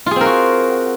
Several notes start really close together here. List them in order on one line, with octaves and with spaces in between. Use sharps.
F4 G#4 C4 A#4 F#4